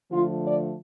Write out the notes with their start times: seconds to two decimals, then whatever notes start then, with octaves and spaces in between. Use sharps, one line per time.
0.12 D3 F3 A3 F4
0.44 D5